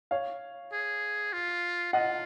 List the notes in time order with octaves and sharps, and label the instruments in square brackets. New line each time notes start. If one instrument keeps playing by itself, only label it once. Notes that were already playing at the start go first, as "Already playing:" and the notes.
[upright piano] C#5 F5
[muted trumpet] G#4
F4
[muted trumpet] F4 [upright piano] D#5 F#5